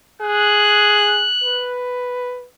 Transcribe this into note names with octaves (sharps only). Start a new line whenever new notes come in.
G#4 F#6
B4